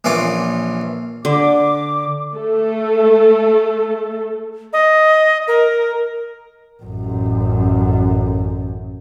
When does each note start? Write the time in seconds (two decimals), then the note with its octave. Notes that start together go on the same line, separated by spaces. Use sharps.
0.04 A#1 E3 C#4 F4 D6
1.25 D3 D6
2.34 A3 A4
4.73 D#5
5.48 A#4
6.83 A1 F#2